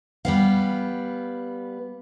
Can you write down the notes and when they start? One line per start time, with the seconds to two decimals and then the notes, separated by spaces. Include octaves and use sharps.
0.25 G3 B3 F5